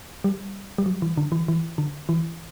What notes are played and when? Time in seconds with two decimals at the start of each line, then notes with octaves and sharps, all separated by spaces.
0.24 G3
0.78 G3
0.86 F#3
1.02 E3
1.17 D3
1.32 E3
1.48 E3
1.78 D3
2.09 E3